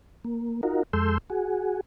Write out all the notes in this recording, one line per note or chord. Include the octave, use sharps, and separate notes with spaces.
A#3
D#4 F4 F#4 A#4
F2 G#3 A4 C6 E6 G6
F#4 G#4